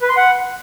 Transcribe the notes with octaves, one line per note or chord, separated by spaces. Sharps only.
B4
C6
F#5